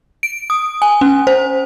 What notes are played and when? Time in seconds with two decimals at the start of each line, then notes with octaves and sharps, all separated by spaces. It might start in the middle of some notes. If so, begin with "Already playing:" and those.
0.23 D7
0.50 D#6
0.82 G#5
1.01 C#4
1.27 C5